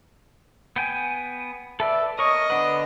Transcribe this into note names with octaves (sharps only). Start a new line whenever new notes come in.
B3 G5 G#5
A4 B4 D5 E5
A#4 C#5 D#5 C#6
D3 B3 D4 B4